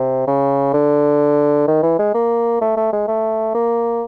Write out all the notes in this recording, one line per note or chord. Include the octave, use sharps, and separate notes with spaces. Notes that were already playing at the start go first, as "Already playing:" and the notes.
Already playing: C3
C#3
D3
D#3
E3
G#3
A#3
A3
A3
G#3
A3
A#3